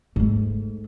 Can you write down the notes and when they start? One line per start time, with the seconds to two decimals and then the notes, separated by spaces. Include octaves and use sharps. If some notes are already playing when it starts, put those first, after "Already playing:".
0.16 G#2 A3